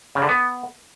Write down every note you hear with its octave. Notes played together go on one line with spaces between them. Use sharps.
C#3
D3
B3